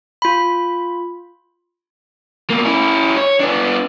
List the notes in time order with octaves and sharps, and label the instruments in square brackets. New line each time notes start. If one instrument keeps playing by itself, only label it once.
[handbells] F4 B5
[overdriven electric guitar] B2 A#3
C#4 E4
C#5
B3 D4